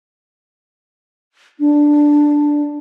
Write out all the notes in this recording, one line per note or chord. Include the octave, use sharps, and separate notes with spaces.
D4